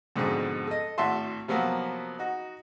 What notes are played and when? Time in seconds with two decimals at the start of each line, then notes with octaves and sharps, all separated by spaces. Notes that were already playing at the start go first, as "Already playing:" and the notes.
0.16 F2 G#2 B2 D3 G#3
0.67 A4 D#5
0.98 G#1 A2 F#4 E5 A5 C6
1.48 C3 F3 F#3 A#3 B3
2.19 D#4 F#4